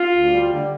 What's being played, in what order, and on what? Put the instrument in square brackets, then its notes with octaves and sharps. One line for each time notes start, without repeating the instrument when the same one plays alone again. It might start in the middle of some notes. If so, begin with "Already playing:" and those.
Already playing: [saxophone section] F4
D2
G3
D3